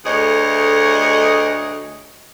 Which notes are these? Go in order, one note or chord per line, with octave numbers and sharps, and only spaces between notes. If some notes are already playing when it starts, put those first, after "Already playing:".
D2 A3 G#4 C#5 D#5